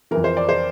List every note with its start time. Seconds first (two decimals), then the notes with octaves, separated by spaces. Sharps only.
0.11 F2 E3 A#4
0.24 C5
0.37 D5
0.49 C5